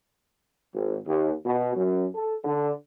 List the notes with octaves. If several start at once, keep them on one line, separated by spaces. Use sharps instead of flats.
G#1
D#2
B2
F#2
A4
D3